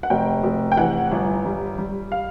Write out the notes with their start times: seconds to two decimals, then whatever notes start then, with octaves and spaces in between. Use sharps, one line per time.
0.03 F#5
0.10 F1 G5
0.43 F1
0.72 G5
0.77 E3 F#5
1.11 G1
1.45 G3
1.78 G3
2.12 F5